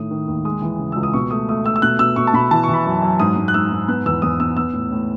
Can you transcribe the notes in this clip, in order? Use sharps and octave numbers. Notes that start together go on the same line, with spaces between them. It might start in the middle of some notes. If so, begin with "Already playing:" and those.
Already playing: A2 D#3 A3 D#6
D#3
D#2
G#3 D#6
E3
C#3
C#2 E6
D#6
B2 C#6
A3 D#6
A3 D#6
A3 E6
E6
B2 F#6
B2 E6
B2 C#6
A5
B2 B5
E3 A5
C#6
E3
B5
F#2
F#2
G#2 D#6
G#2
F#6
G#2 E6
G#2
B3 F#6
E2 E6
E2 D#6
B3 E6
B3 E6
A2
A2